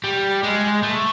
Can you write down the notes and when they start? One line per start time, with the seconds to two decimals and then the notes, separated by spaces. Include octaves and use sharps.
0.04 G3
0.43 G#3
0.83 A3